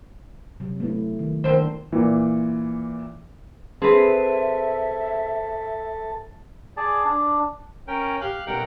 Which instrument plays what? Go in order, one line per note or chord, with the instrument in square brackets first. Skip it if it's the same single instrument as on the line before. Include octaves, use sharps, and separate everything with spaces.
[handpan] C3 F#3
A3 B3 E4
D#3
[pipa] D3 C4 C5 [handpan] D#3 A#4
[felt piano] A#2 E3
[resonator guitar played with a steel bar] C4 B4 [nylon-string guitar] G#4 C5 [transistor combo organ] A4 A5 [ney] E5
[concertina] G#4 D5 A5
D4
C#4 A#4 G5
[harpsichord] G4 [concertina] F5 F#6
[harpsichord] B1 C#4 [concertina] A#4 F#5 G5